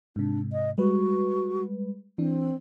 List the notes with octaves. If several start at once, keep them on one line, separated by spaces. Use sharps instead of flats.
G#2 C3 D4
D#5
G3 G#3 F#4 B4
E3 C4 D4